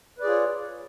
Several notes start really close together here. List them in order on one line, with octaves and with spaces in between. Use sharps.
B4 D5 G#4 F4 C#5